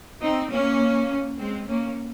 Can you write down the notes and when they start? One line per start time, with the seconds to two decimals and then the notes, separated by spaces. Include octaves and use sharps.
0.22 C4 D#4
0.50 A#3 C#4
1.38 G#3 C4
1.67 A#3 C#4